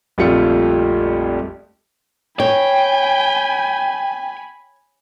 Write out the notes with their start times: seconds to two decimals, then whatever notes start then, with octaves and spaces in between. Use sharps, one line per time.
0.18 A#1 F2 G3 A3 F4 C#7
2.40 C#5 G5 G#5 B5